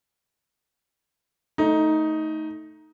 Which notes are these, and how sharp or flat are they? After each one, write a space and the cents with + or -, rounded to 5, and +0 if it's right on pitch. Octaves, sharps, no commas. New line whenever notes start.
A3 +0 D#4 +10